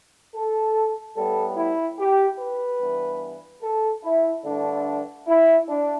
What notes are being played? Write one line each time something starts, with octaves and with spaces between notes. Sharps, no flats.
A4
A2 G3 B3 A4
E4
G4
B4
G2 E3 B3
A4
E4
G2 D3 A3 D4
E4
D4